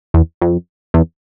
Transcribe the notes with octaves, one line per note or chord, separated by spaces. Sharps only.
E2
F2
E2